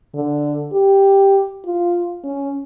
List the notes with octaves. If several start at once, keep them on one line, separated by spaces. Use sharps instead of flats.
D3
G4
F4
C#4